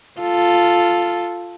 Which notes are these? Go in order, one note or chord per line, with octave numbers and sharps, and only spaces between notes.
F4 A4